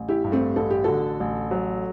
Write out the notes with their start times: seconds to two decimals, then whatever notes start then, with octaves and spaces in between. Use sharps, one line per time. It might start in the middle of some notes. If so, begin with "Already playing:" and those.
Already playing: A1
0.09 E4 G4
0.24 G2
0.32 A3 C4
0.56 A1 A4
0.70 G4
0.84 D3 F#4 A4
1.20 A1
1.51 F#3